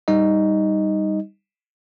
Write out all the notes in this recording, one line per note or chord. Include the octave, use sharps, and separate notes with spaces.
G3 D#4 D#5